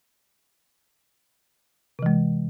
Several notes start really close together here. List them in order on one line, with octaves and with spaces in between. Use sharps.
C3 E3 G#3